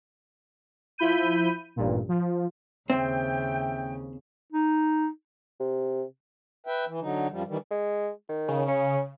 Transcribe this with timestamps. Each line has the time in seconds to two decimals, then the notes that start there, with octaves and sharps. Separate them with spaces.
0.98 F3 E4 B5 G6 D#7
1.76 A1 G2 A#2
2.08 F3
2.90 D#2 C#3 C4 E5 G5
4.53 D#4
5.60 C3
6.67 B4 E5 G5
6.87 E3
7.00 D3 F#3 D#4
7.30 F#2 F3 G3
7.47 D#3 E3 G3
7.71 G#3
8.29 D#3
8.48 C#3
8.68 C#4